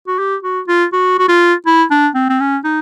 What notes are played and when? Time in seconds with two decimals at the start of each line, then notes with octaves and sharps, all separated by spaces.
0.08 F#4
0.19 G4
0.43 F#4
0.68 F4
0.93 F#4
1.19 F#4
1.28 F4
1.66 E4
1.91 D4
2.15 C4
2.30 C4
2.40 C#4
2.64 D#4